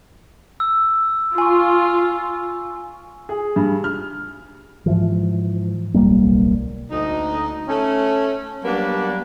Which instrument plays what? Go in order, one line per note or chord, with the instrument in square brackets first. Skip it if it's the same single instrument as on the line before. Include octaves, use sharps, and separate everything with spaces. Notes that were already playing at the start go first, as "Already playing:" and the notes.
[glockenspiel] E6
[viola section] F4 [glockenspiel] G#5 C#6
[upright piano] G#4
G2
F6
[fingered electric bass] G#2 E3 F3
D1 B1 G3 A#3
[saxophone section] D2 D#4
A3 C#4
F#3 G3 A#3 B3 D4